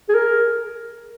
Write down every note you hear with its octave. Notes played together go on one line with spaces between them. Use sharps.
G#4
A#4